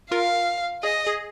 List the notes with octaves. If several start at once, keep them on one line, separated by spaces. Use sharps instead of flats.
F4 A#4 F5
G#4 D#5
G#4